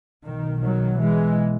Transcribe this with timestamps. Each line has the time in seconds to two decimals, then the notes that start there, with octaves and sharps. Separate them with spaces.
0.24 B1 B2 D#3
0.62 D#3 F#3
1.00 E3 G#3